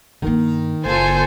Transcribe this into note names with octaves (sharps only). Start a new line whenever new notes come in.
G2 D#3 A#3
F#1 F4 A4 C5 G#5